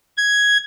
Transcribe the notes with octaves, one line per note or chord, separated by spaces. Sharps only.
G#6